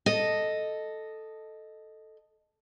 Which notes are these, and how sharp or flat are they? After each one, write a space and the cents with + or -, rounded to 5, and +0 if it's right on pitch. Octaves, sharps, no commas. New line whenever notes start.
A4 +0 D#5 -5